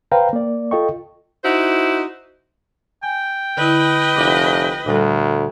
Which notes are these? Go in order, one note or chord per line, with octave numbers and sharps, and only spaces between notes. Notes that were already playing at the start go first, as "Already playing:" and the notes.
B4 C5 F5 G5 A#5
A#3 D5
F4 A4 D#5 G5 C#6
D#4 E4 F#4 C5
G5 G#5
D3 E4 B4 D#5
F1 D6
D2 A#2 G3 A4